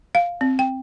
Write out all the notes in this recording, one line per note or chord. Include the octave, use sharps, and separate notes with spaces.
F5
C4
G5